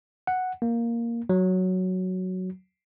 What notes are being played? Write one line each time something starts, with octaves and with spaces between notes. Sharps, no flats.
F#5
A#3
F#3